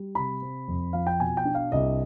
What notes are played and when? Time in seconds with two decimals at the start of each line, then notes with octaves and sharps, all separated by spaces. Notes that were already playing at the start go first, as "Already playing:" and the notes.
Already playing: G3
0.15 C3 B5
0.42 C4
0.68 F2
0.93 F3 F5
1.07 G5
1.20 B2 G#5
1.37 G5
1.45 D4
1.55 F5
1.72 C2 D#5